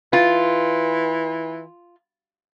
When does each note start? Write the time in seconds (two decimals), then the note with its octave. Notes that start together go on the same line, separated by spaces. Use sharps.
0.13 E3 F4